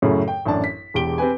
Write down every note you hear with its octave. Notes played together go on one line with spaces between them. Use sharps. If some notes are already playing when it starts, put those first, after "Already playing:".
F#2 A2 C#3 F#3
G5
A1 F#2 D4 A5
B6
E1 E2 G4 D7 G7
C4 G4 B4 G#5